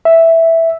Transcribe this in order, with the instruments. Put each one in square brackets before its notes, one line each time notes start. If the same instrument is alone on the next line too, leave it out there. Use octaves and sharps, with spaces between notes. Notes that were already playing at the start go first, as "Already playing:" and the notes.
[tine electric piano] E5